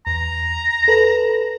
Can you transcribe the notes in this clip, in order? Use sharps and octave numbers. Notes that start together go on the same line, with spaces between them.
E2 A#5
A4 B4